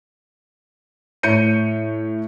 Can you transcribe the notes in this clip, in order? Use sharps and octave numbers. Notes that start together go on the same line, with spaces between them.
A2 C#5 G6 C#7 D#7